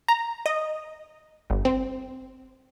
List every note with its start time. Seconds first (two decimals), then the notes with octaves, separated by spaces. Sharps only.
0.08 A#5
0.46 D#5
1.50 G1
1.65 C4